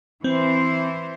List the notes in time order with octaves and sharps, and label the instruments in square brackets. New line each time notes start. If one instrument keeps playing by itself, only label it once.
[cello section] E3 C5 [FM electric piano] C4